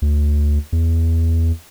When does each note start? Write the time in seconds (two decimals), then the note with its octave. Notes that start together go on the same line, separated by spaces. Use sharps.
0.02 D2
0.73 E2